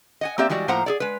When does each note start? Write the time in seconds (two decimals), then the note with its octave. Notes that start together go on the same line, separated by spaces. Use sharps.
0.21 D#5 F#5 G#5
0.38 A#3 C4 G4 D5 E5
0.50 E3 G3 G#3 F#4 D5
0.68 A2 F3 A#3 C5 F#5 A#5
0.86 G#4 A4 D5
1.00 G#3 B4